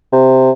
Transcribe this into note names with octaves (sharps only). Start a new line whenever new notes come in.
C3